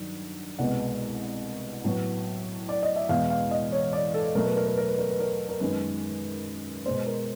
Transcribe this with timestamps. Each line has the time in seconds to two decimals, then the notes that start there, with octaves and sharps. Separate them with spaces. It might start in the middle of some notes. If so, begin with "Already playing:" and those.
Already playing: G2 D#3 F#3
0.59 C2 B2 G#3 B3 F#5
1.84 A2 F#3 B3
2.69 D5
2.83 D#5
2.96 E5
3.09 E2 B2 G#3 B3 F5
3.30 F5
3.51 D#5
3.72 C#5
3.93 D5
4.14 A4
4.35 B2 F#3 A3 A#4
4.45 B4
4.57 A#4
4.67 B4
4.78 A#4
4.88 B4
4.99 A#4
5.10 B4
5.20 A#4
5.49 A#4
5.60 F#2 D#3 G#3 B3 B4
6.86 B2 G#3 B3 C5
7.07 A#4